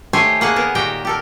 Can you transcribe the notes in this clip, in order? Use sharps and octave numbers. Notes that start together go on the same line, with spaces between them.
D#3 A3 G4 C5 C#5 G#5
A#3 G#4 F#5
B3 A#4
A#2 D#3 F#4 G4 G5 A#5
G4 A4 A#4